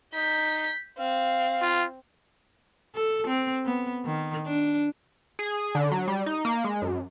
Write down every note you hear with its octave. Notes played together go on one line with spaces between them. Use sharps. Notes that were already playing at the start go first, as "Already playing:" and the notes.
D#4 G6 B6
C4 F5
F4
A4
C4
B3
D#3
D4
G#4
D3
F#3
G3
D#4
A#3
G#3
F#2